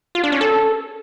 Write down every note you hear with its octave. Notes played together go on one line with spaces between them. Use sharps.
F4
D4
C#4
A4